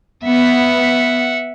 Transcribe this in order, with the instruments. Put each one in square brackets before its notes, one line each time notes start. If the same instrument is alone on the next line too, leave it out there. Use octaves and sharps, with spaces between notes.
[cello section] B3 [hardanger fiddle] E5 F#5